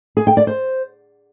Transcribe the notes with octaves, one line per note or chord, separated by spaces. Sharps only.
G#4
G5
D5
C5